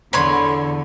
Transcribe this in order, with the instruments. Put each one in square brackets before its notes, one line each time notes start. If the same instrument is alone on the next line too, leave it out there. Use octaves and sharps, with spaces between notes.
[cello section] E2 D3 [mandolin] C#5 B5 C6